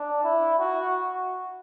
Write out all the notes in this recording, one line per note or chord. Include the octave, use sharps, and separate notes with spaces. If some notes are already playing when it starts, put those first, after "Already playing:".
Already playing: D4
E4
F#4